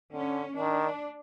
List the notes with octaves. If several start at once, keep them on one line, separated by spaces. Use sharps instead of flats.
D3 C#4
D#3 D4